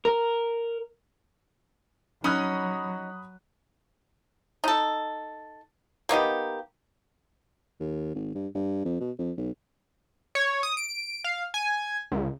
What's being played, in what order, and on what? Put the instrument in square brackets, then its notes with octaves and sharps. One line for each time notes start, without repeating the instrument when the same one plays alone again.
[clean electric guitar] A#4
[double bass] F#3 [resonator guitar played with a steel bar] C#4 D#4 [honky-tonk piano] B5 D#6 F#6
[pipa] D#4 A4
A#3 B3 D#4 G4
[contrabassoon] D#2
G#1
G2
G2
F2
B2
F2
B1
[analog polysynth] C#5
D#6
D7
F5
G#5
C#2